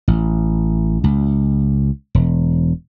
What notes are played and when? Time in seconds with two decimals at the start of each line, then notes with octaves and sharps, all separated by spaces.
0.08 A1
1.04 C#2
2.15 E1